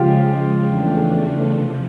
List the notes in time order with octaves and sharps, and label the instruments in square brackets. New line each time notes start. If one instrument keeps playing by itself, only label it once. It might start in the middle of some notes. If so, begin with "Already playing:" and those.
Already playing: [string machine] C#3 F3 G#3 [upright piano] F4 G4
[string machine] E2 C#3 E3 A3 D4
E2 C3 F3